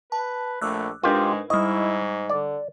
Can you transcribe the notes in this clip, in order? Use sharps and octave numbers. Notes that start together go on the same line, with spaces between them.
B4 A5
A#1 A3 D6 E6 F#6
G#2 G#3 D4 F4 G4 A#4 B4
G#2 G3 E4 D#5 C#6
D3 D5